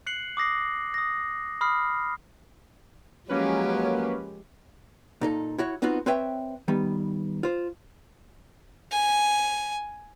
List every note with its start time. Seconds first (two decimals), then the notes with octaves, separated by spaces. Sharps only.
0.06 F#6 C7 C#7 F#7
0.37 D6 D#6 A#6 C7
0.94 D#6 A#6
1.61 B5 D#6 F6 C7
3.29 F3 F#3 G#3 A#3 C#4 G4 B4 C#5
5.21 A#2 D#4 A4
5.58 E4 F#4 C#5
5.82 B3 C4 D#4 F4 F#4
6.06 C4 B4 C#5 E5 G5
6.68 D#3 G3 B3
7.43 F4 C5
8.92 G#5